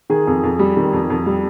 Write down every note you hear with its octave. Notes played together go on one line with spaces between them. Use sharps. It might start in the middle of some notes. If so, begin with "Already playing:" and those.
D#3 G#4
F2
F2
G3
D#3
F2
F2
G3